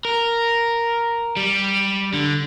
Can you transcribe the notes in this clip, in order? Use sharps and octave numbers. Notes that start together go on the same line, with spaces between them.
A#4
G3
D3